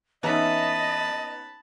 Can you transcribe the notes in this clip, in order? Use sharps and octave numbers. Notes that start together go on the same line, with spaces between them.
E3 B3 C#4 D#4 D#5 E5 A5 B5